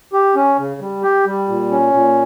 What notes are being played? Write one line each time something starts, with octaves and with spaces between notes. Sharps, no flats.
G4
C#4
C#3
G3
G4
G3
A#2
C#4
A#2